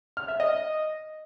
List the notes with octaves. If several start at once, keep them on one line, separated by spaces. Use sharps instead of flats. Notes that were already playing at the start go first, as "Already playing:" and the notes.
F6
E5
D#5